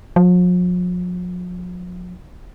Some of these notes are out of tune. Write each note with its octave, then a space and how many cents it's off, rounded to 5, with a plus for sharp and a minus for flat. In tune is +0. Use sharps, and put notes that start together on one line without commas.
F3 +45